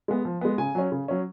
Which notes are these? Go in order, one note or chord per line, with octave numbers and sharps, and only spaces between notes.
G#3 B3
F3
G#3 B3
C#3 G#5
F#3 C#4
C#3
F#3 C#4